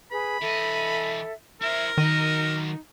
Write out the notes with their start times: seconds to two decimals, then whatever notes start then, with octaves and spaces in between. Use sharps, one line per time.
0.12 G#4 B4 B5
0.41 E3 A4 D#5 E5
1.62 E4 A#4 C5 E5
1.98 D#3 F#3 D#4 D#5